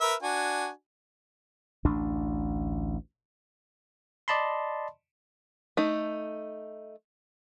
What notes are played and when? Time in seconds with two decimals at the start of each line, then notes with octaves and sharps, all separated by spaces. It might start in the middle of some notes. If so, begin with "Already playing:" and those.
0.01 A#4 B4 E5
0.23 D4 F#4 G#5
1.85 A1 D2 D4
4.28 D5 D#5 A5 B5 C6
5.77 A3 D#4